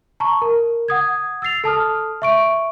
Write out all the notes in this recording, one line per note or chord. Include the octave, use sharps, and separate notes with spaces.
A5 A#5 C#6
A#4
F#5 D#6 G#6
E6 A6 C7 F7
A4 A5 D#6 F6
E5 C#6 D7